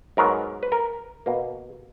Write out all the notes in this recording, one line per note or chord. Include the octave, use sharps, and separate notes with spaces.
G#2 F#3 B3 A#4
B4
A#4
B2 A#3